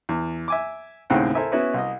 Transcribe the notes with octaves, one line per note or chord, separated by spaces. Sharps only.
E2
E5 G#5 D6
D#2 A2 C#3 C4 F#5 G5
E4 A4 A#4 C5 E5 G#5
B3 C#4 E4 F#4 B4 C#5
C2 D#5